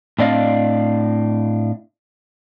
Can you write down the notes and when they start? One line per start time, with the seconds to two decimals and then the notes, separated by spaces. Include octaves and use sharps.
0.19 A2 C4 D4 D5 D#5 F5